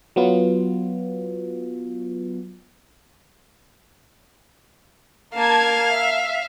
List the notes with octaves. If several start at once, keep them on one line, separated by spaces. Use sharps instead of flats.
F#3 B3 F4
A#3 F5 A5 G#6
E5